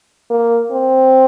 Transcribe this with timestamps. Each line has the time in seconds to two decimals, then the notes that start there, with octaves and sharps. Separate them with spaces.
0.30 A#3
0.72 C4